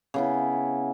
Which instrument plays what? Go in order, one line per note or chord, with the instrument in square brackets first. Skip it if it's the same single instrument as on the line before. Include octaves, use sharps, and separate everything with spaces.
[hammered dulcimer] C#3 B3 E4